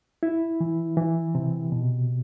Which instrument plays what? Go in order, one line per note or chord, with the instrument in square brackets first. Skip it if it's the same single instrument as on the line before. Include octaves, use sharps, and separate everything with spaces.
[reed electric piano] E4
E3
E3
C3
B2